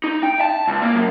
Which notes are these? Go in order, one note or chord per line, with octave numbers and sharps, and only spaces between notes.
D#4
G5
A5
C#2
A#3
F#2